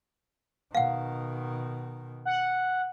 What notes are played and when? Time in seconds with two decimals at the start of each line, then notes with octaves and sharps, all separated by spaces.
0.75 B2 D#3 F5 F#5
2.25 F#5